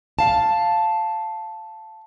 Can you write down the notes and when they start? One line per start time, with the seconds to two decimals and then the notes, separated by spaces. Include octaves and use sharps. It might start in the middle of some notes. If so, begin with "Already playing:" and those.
0.19 F5 A5